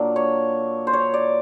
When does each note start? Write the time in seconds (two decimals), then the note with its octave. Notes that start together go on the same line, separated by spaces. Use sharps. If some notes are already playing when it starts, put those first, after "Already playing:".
Already playing: A#2 F#3 A#3 D4
0.16 C#5
0.87 C5
0.93 C#5
1.14 D5